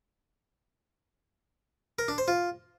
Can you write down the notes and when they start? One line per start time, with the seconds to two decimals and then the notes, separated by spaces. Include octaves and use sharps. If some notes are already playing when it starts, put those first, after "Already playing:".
1.99 A#4
2.08 D4
2.18 C5
2.28 F4